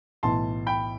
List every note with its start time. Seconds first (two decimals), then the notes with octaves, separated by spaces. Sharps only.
0.23 B1 A2 E3 A5 C6
0.67 G5 B5